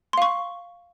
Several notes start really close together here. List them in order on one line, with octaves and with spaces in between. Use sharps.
C6 F5 C#6